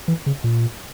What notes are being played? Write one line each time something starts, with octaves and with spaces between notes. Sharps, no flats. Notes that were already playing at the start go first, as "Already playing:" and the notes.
E3
C#3
A#2